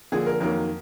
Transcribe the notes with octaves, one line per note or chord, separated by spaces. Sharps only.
D3 F3 A#3 G#4
A#4
F2 D#3 F#3 A#3 A#4